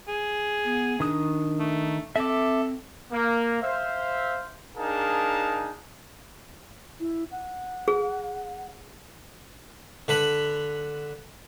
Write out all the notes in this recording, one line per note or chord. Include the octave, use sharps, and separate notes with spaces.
G#4
B3
D#3 D4 D#6
A3
C4 A4 E5 D6
A#3
C5 E5 F5
D4 D#4 G#4 A#4 F5 A5
E4
F#5
G#4
D3 B4 B5